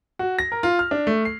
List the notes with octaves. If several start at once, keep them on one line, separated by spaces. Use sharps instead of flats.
F#4
A#6
A#4
F4
F6
D4
A3
C7